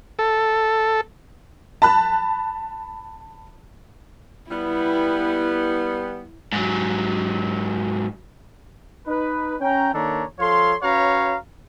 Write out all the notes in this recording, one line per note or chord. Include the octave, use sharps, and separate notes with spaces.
A4
A5 B5 F#6
G3 B3 E4
G#2 F#3
D#4 B4
C#4 G5 A#5
D#3 A#3 D4 A4 C#5 A#5
F3 A4 C#5 F5 C6
C#4 F#4 B4 C#5 F5 A#5